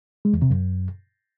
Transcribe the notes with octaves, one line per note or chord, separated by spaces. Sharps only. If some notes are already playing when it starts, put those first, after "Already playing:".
G#3
E2
C3
F#2